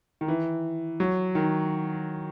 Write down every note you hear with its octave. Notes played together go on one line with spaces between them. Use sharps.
D#3
E3
F#3
D#3